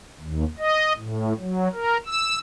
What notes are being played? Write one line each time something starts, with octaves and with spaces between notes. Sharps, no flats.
D#2
D#5
A2
F#3
A#4
E6